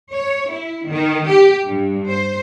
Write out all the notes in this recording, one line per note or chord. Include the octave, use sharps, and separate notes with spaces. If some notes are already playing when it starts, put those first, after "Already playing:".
C#5
E4
D#3
G4
G2
C5